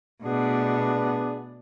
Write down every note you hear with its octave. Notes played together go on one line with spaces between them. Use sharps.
B2 A3 B3 D4 G#4 D5